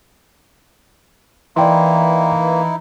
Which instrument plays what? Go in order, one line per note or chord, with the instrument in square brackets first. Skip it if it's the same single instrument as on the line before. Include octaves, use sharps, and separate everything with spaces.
[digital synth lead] E3 [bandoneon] A#3 [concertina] D#4 E4 [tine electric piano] D5 G5 C6